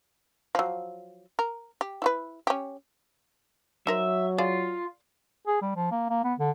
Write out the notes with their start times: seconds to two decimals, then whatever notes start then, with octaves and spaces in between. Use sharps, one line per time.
0.55 F3 F#3
1.39 A#4
1.81 G4
2.02 E4 F#4 B4
2.47 C#4 G4
3.87 F#3 D#4 A#4 C5 E5
4.38 F4 G#4 D5 F5
5.47 G#4
5.62 G3
5.76 F3
5.91 A#3
6.09 A#3
6.24 B3
6.39 D3